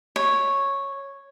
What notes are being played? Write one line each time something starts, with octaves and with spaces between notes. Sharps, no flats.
C#5